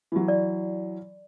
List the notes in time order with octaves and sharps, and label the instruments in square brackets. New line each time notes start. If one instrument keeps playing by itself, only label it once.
[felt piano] E3 F#3
[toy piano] D5